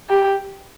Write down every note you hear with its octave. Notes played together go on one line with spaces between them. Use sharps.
G4